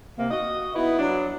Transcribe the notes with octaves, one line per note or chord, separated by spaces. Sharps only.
C3 A#3
F#4 D#5
B3 D#4 E4 B4
F#3 D4